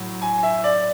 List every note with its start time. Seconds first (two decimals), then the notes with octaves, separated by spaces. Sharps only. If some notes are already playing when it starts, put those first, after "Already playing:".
Already playing: A2 F#3
0.22 G#5
0.43 E5
0.64 D5